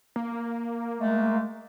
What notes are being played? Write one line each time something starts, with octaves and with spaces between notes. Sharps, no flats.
A#3
G#3 A3